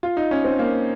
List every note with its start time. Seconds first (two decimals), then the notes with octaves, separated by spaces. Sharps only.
0.03 F4
0.17 D#4
0.31 C#4
0.44 C4
0.59 A#3